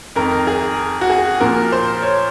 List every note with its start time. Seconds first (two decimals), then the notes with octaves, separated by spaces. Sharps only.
0.16 F2 D#3 A#4
0.47 G#4
1.01 F#4
1.10 G#4
1.40 A#2 F3 A#4
1.72 C5
2.02 C#5